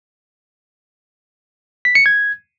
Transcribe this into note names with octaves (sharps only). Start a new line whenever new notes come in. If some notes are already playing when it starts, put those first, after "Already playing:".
B6
C#7
G#6